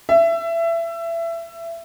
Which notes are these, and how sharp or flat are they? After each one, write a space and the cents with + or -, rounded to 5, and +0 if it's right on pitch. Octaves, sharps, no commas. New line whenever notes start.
E5 +25